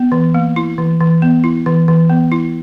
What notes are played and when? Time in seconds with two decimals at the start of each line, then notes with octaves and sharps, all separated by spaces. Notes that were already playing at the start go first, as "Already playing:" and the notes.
Already playing: B3
0.12 E3
0.34 A#3
0.56 E4
0.78 E3
1.00 E3
1.22 B3
1.44 E4
1.66 E3
1.88 E3
2.10 B3
2.32 E4